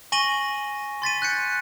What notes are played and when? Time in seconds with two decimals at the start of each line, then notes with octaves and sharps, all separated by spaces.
0.12 G#5 C#6 A#6 D#7 F#7 G7
1.02 C6 A6 B6 D#7
1.22 F#6 G6 C#7 D#7